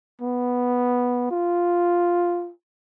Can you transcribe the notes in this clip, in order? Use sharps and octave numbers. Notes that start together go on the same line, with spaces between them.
B3
F4